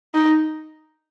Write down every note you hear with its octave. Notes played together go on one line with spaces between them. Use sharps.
D#4